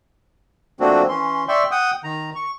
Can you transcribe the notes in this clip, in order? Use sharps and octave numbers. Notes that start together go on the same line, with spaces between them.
F3 A3 A#3 C4 D4 F#4
E3 C#4 C6
D5 E5 G5 C6 C#6
F#5 G5 D#6
D#3 A#5
C#6